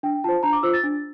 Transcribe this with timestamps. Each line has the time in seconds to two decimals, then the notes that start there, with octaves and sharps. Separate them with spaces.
0.03 D4 G5
0.24 F4 C5 A5
0.43 D4 A#5
0.53 D6
0.63 F4 C5 E6
0.74 A6
0.84 D4